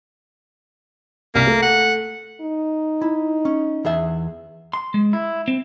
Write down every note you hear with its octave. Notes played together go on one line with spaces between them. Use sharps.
C2 A#3 F6 B6
A3
F#5
D#4
E4
C#4
E2 G#4 E5
C6
G#3
E4
C4